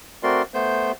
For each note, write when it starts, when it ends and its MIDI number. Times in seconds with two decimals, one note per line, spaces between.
0.23 0.42 57
0.23 0.42 60
0.23 0.42 66
0.23 0.42 70
0.23 0.42 74
0.23 0.42 84
0.54 0.92 57
0.54 0.92 59
0.54 0.92 72
0.54 0.92 91